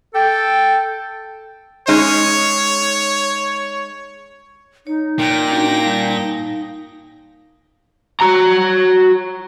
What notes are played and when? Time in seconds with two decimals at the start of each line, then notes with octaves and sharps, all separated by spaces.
0.15 A4 G5
1.88 G#3 C#4 D#4 C#5
4.87 D#4 C#5
5.19 A#2 G5 A#6
5.48 C#4 D4 F#4
5.81 G3 F5 A5
6.17 D#4 F5
8.21 F#4 A#5